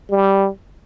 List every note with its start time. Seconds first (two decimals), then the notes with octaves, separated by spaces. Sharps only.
0.11 G3